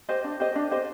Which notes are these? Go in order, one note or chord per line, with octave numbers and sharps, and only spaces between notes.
G4 C5 D#5
D4
G4 C5 D#5
D4
G4 C5 D#5